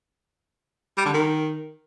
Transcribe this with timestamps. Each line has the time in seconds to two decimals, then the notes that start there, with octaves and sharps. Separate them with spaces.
0.97 G3
1.05 D3
1.13 D#3